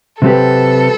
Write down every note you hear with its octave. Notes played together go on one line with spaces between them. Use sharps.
C3 F#3 C4 G4 A4 B4